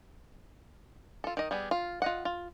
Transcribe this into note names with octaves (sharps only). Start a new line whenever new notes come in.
F4 A4
D#3 D#5
G3 B3 G#4
F4
F4 D#5 F#5
F4